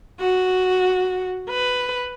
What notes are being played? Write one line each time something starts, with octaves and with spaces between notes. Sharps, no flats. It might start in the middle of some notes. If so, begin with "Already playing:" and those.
F#4
B4